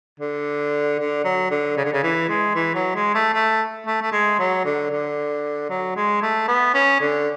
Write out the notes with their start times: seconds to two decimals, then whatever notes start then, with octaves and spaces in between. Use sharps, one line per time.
0.20 D3
0.99 D3
1.25 F#3
1.51 D3
1.77 C#3
1.85 D3
1.93 C#3
2.03 E3
2.29 G#3
2.55 E3
2.75 F#3
2.95 G#3
3.14 A3
3.34 A3
3.87 A3
4.02 A3
4.12 G#3
4.39 F#3
4.65 D3
4.91 D3
5.69 F#3
5.96 G#3
6.22 A3
6.48 B3
6.74 C#4
7.00 D3